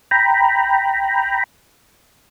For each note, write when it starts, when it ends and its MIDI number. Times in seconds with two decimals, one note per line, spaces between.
0.11 1.43 79
0.11 1.43 82
0.11 1.43 83